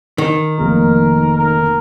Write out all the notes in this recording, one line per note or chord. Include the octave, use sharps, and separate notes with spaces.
D#3
F1 A#3 A#4
A#4